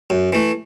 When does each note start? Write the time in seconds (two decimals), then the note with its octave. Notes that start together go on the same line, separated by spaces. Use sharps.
0.10 F#2
0.33 E3 A3